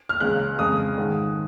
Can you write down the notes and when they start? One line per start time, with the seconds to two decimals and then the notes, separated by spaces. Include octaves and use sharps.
0.09 F6
0.20 C#2 C#3 G#3 F#6
0.59 F2 C#3 G#3 D#6
0.97 G#2 D#3 G#3